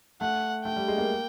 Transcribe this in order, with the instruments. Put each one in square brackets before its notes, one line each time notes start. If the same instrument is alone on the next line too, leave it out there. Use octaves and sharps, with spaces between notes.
[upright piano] A3 [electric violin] F#5
[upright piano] A3 [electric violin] G5
[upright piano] G3
G#3
A#3